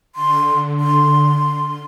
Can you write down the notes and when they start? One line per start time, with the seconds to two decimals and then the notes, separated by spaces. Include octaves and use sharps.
0.15 D3 C6
0.80 C6